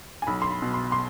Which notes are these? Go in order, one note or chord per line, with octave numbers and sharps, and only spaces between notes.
G#5
B1 B5
C6
B5
B2
C6
C6